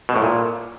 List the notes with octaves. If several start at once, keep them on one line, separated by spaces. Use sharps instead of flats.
B2
A2
A#2